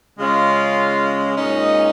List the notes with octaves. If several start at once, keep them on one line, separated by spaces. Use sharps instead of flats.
C#3 G#3 C#4 F4 F5
A#2 G#3 C#4 D#4 D#5